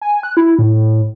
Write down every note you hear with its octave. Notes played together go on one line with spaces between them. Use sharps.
G#5
F#6
E4
A2